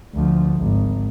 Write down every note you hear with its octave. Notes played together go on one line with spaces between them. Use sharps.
D2 F3
G#1